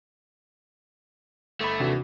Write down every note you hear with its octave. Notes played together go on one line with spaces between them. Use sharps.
G1 A3 B5
D#2 C3 E3 D4 F#4